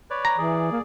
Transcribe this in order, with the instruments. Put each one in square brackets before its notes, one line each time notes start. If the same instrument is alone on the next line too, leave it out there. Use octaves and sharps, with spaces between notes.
[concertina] B4 C#5 D5
[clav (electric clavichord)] A#5
[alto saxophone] E3 [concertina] G#4 D5
[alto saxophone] A#3